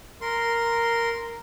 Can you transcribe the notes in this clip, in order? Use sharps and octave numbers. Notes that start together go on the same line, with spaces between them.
A#4 C6